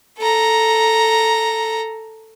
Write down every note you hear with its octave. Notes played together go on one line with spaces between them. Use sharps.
A4 A#5